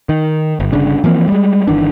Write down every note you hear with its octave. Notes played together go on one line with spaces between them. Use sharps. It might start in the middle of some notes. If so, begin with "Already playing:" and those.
D#3
G1
G1 C#3 D4
E3 F3 A#3 C4
G3 G#3
G1 D#3 E3 D4